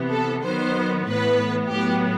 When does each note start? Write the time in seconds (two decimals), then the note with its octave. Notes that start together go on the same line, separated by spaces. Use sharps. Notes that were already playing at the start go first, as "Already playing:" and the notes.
Already playing: C3 E3 B3
0.11 A4
0.43 D#3 F#3 B3 C5
1.07 A2 E3 B3 B4
1.71 A2 F#3 B3 G4